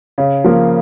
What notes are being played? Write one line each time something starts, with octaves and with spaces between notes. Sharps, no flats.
C#3
F3 A#3